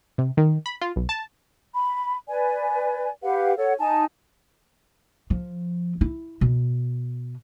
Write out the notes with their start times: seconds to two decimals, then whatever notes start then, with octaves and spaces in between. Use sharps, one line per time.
0.18 C3
0.37 D#3
0.66 B5
0.81 F4
0.96 B1
1.09 A5
1.73 B5
2.28 B4 D5 G#5
3.22 G4 B4 F5 F#5
3.57 A4 C#5 F#5
3.79 D#4 G#5 A5
5.30 F3
6.01 E4
6.41 B2